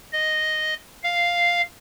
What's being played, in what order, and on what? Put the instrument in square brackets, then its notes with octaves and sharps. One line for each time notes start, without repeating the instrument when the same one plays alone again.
[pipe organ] D#5
F5